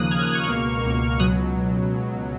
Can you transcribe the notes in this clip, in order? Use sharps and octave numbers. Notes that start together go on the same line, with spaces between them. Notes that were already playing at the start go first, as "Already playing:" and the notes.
Already playing: D#2 C#3 F3 A#3 D#6 F#6
D#2 C#3 F3 A#3 F6 G#6
D#6 F#6
C#6 F6
C#2 B2 A#3
C#2 B2 A#3
C#2 B2 F#3 D#6 F#6